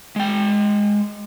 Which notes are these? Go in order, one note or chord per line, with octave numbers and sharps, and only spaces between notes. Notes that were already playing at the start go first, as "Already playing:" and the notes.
G#3 G5